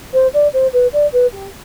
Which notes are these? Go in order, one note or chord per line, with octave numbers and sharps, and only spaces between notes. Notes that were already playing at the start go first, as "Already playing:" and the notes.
C5
D5
C5
B4
D5
B4
G4